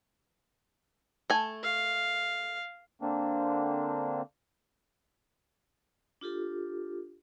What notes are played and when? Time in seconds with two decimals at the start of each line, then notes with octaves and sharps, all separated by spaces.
1.30 A3 G#5
1.63 F5
3.01 D3 A#3 C4 D4
6.21 D4 F4 G4 A4